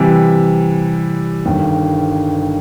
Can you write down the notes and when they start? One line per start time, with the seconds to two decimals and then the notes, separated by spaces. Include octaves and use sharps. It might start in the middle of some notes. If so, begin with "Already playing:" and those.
Already playing: C3 E3 G3
1.45 G1 G2 D#3